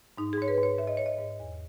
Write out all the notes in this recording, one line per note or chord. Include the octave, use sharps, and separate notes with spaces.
G#2 D#4
G#4
G#2 C#5
B4
G#2 C#5
G#2 E5
D#5
G#2 C#5
D#5
G#2
E2